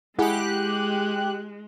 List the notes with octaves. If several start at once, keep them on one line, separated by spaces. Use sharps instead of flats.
G#3 E4 G4 G#4 F#5 F#6